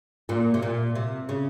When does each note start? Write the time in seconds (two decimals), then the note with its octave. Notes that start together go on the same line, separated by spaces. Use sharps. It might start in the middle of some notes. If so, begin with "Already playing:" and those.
0.29 A#2
0.54 C3
0.62 A#2
0.95 C3
1.29 C#3